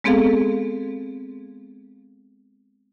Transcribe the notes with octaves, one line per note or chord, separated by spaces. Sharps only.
G#3 B3 C4 G#4 A4 F5